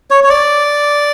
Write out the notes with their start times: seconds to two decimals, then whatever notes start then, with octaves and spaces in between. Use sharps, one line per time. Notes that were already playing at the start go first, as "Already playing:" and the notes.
0.10 C#5
0.24 C#5
0.30 D5